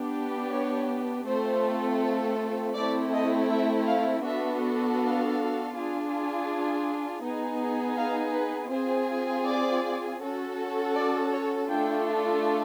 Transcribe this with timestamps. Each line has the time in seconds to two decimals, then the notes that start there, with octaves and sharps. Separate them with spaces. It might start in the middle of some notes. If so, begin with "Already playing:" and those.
Already playing: B3 D4 G4
0.51 C#5
1.26 A3 C4 F4 A4 C5
2.75 A3 C4 E4 A4 D5
3.12 D#5
3.50 E5
3.87 F5
4.23 B3 D4 F#4 A4 E5
4.99 F5
5.73 D4 F4 G#4
7.22 B3 D#4 G#4
7.96 F5
8.34 B4
8.70 C4 F4 G#4 C5
9.45 D5
10.21 C#4 F#4 A4
10.95 D5
11.32 C#5
11.69 A3 D4 F4 A4 G5